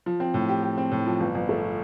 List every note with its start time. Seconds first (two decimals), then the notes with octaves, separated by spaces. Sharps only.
0.06 F3
0.20 C4
0.34 A2
0.49 G4
0.63 G4
0.78 C4
0.91 A2
1.06 F3
1.20 G1
1.35 G1
1.49 A3